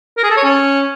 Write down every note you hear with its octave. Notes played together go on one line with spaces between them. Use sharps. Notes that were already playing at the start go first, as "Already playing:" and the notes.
A#4
G#4
A4
C#5
C#4